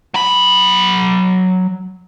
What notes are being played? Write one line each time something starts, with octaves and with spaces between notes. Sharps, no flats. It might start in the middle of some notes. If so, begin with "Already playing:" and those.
F#3 B5